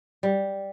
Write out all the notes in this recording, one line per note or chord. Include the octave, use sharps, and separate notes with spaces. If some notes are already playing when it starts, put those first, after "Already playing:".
G3